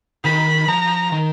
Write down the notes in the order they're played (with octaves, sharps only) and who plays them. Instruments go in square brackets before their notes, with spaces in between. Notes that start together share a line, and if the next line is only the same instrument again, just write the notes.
[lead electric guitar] D#3 [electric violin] B5
[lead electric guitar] F3 [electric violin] A#5
[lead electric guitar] D#3